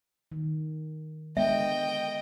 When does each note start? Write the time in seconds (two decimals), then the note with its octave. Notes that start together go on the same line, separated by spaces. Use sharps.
0.32 D#3
1.37 D3 G#3 B3 D#5 E5 G5